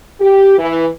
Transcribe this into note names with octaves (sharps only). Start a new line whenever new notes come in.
G4
E3